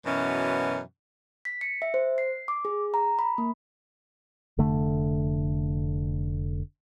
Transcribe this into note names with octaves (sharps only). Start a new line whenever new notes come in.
F#2 B2 E3 C#4
B6
C#7
E5
C5
C7
D6
G#4
A#5
B5
A#3
F1 D3 A3